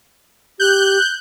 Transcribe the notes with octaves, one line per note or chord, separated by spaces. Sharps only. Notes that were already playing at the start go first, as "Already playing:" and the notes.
G4 F#6 G6